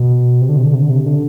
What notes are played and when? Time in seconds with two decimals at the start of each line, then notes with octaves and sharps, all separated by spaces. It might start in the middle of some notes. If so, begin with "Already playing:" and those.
Already playing: B2
0.41 C3
0.49 D3
0.57 C3
0.65 D3
0.74 C3
0.82 D3
0.90 C3
1.06 D3